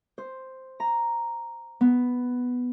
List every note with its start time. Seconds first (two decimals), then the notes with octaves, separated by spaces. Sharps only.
0.18 C5
0.80 A#5
1.81 B3